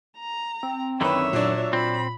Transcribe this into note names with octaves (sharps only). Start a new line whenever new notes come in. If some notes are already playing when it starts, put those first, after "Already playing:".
A#5
C4
F#2 D3 D#3 E4 B4 C#5 E5
A#2 F#3 D4
A#2 C4 B5